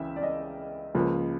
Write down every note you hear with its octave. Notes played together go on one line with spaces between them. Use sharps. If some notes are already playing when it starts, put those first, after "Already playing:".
Already playing: C#2 C#3 E3 E5 G5
D5
D#5
C#2 C#3 F3 A#3